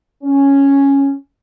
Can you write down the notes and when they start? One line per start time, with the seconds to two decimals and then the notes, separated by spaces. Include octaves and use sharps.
0.23 C#4